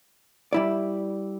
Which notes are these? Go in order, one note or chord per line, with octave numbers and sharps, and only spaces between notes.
G3 E4 D5